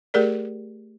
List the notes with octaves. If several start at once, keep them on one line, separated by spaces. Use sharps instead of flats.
A3 G4 G#4 A#4 D5